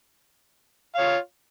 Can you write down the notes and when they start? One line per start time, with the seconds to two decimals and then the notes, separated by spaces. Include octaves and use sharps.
0.95 F5
0.98 C#5
1.00 F4